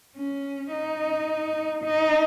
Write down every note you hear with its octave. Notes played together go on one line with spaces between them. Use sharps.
C#4
D#4
D#4